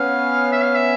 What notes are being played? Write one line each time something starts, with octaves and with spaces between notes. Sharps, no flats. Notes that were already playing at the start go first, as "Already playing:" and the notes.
Already playing: B3 C#4 F5
E5
F5
E5